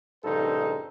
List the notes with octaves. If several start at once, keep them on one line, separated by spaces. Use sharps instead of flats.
A#1 G2 C#3 D#4 A4 C5